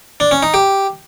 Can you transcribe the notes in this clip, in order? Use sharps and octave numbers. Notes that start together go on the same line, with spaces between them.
D4
C#4
D#4
G4